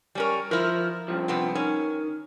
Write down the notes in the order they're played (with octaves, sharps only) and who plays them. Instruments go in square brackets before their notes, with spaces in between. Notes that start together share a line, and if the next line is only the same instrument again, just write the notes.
[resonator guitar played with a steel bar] G3 C#4 A#4
[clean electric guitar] F3 [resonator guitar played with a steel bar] E4 A#4
[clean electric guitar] G2 F3
[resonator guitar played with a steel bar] C3 B3 C4
[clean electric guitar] D#3 [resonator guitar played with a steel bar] C#4